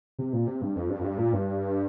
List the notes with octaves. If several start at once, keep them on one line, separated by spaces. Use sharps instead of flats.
C3
A#2
C3
G2
F2
G2
F2
G2
A#2
G2